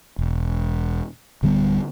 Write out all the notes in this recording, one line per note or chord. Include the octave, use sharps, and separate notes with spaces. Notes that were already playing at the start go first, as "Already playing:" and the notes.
E1
D1 D3 G3 B3